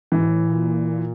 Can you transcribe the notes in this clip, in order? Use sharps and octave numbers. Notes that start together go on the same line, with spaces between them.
A2 E3
G#2
A2
A#2